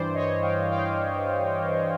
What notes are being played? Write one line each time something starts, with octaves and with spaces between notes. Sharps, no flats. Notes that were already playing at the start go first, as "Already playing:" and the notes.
Already playing: G2 E3 C5 D5
C#5 D#5
F5 G5
F5 G5